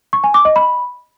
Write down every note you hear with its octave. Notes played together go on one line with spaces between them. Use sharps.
C#6
G#5
D6
D#5
B5